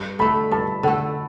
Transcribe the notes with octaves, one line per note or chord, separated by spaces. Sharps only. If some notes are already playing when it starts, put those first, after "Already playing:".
Already playing: G2
D3 A3 B5
G2 A5
D3 A3 F#5